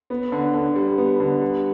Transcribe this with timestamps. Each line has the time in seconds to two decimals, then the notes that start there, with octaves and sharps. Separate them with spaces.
0.10 B3
0.32 D3
0.54 D3
0.76 G3
0.98 B3
1.20 D3
1.41 G3